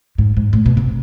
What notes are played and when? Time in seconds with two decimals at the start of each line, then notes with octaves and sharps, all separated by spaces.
0.18 G#2
0.37 G#2
0.53 A2
0.66 B2
0.77 C3